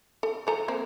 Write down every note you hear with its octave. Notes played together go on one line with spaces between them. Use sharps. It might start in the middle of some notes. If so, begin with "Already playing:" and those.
A4
F3 A4 A#5
A#3 C4